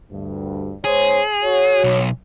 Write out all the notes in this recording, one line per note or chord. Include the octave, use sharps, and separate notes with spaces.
D2 G2
G#2 G#4 C5 C#5
F#4 C#5
B1